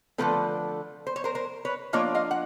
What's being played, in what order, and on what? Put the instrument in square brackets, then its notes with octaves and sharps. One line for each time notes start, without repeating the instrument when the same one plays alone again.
[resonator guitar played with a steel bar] D3 F3 A3 C4 A4 B4
C5
C#5
A#4 C5
A#4 C5
B4 C#5
F3 A#3 D4 F4 C#5 D#5
D#5 F5
F#5